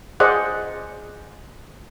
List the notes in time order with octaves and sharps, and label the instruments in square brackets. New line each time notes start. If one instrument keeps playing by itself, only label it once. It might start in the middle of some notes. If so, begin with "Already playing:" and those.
[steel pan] G#4 C5 D5 D#5 F#5